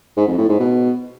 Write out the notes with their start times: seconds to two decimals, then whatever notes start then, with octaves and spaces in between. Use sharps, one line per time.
0.17 G#2
0.27 F2
0.38 A2
0.49 G#2
0.60 B2